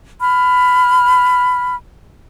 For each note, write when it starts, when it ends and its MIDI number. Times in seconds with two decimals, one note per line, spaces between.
0.21 1.75 83
0.21 1.75 89